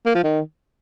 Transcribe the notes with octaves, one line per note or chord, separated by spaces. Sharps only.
A#3
F3
D#3